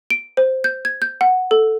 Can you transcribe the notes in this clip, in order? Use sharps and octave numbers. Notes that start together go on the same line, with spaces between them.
D7
C5
G6
G#6
G6
F#5
A4